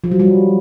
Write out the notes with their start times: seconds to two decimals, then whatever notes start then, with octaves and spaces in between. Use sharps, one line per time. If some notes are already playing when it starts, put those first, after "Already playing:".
0.04 F3
0.12 F#3
0.20 G3